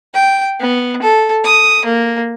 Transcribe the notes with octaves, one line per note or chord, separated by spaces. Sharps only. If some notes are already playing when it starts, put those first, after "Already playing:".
G5
B3
A4
D#6
A#3